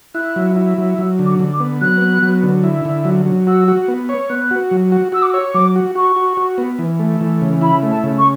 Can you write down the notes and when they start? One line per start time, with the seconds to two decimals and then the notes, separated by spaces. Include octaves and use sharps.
0.15 E4 F#6
0.36 F#3
0.56 E4
0.78 F#3
0.98 F#3 E6
1.19 D3
1.25 D6
1.39 D3
1.53 D6
1.60 B3
1.81 F#3 F#6
2.01 B3
2.22 F#3
2.43 D3
2.64 E4
2.85 D3
3.05 F#3
3.26 F#3
3.47 F#4 E6
3.68 F#4
3.88 B3
4.09 C#5
4.30 B3 F#6
4.51 F#4
4.71 F#3
4.92 F#4
5.12 F#4 E6
5.22 D6
5.31 C#5 E6
5.54 F#3 D6
5.76 F#4
5.95 F#4 C#6
6.16 F#4
6.37 F#4
6.58 B3
6.79 E3
6.99 A3
7.21 E3
7.41 C#3
7.61 E4 B5
7.83 A3
7.90 A5
8.03 C#3
8.18 C#6